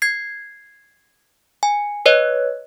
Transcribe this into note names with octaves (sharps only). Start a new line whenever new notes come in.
G#6 C7
G#5
B4 C#5 D#5